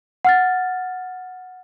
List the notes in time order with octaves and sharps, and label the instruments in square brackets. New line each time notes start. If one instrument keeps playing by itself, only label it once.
[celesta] F#5 F6 A6